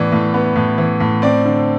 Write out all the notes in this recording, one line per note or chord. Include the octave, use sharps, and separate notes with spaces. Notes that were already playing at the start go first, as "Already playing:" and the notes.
Already playing: A2 E3 B3 D5
A2
B3
A2
E3
A2
C4 D5
D3